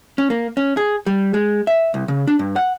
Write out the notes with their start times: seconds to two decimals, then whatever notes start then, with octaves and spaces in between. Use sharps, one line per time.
0.18 C#4
0.30 A#3
0.57 C#4
0.77 G#4
1.06 G3
1.34 G#3
1.67 E5
1.94 C2
2.08 C#3
2.27 D4
2.39 G2
2.56 F#5